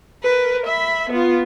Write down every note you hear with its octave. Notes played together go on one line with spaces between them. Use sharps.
A#4 B4
E5 B5
B3 F4